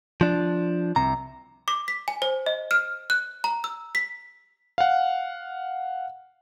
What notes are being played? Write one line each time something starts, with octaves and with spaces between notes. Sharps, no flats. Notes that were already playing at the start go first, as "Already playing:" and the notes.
F3 D4
C2 C3 A#5
D6
B6
G#5
C5
D#5
F6
F#6
A#5
E6
B6
F5 F#5